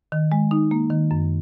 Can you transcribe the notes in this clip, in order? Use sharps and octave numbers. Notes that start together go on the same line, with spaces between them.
D#3
G#3
D#4
A#3
D#3
F#2